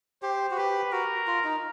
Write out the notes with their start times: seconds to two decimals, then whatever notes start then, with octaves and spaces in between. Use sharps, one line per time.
0.22 G4 C5
0.51 F#4
0.57 G4 B4
0.92 F#4 A#4
1.27 F4
1.44 D#4